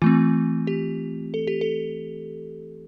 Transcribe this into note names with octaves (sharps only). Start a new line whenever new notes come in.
E3 A3 C4 F4
G4
A4
G4
A4